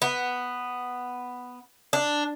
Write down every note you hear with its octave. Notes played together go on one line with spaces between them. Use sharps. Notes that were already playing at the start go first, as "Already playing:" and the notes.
B3
D4